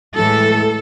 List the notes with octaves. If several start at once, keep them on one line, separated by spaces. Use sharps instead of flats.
A2 E3 G#3 A4